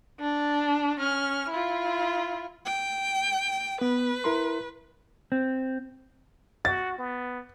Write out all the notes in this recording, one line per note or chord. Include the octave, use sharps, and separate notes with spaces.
D4
C#4 F6
E4 F4
G5
B3 B4
E4 A#4 C6
C4
F#4 A6
B3